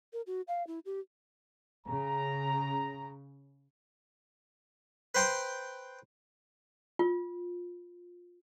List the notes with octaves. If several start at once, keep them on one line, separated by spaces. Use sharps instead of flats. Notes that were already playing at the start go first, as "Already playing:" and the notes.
A#4
F#4
F5
E4
G4
C#3 A#5
B4 C5 G5 A#5 C6
F4